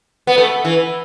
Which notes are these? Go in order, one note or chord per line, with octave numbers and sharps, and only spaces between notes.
B3
A3
E3